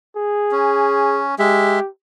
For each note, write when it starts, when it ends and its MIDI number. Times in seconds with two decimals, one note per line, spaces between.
0.16 1.24 68
0.51 1.35 61
1.39 1.79 56
1.39 1.88 67
1.39 1.79 76